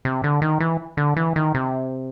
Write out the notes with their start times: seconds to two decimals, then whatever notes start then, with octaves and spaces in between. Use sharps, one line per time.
0.05 C3
0.24 D3
0.42 D#3
0.60 E3
0.97 D3
1.17 E3
1.36 D#3
1.55 C3